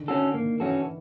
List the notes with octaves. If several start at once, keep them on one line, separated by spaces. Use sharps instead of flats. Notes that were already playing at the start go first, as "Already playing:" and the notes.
Already playing: D3 D#3
C#4 F#4 A4
D#3 A#3
E3 C#4 F#4 A4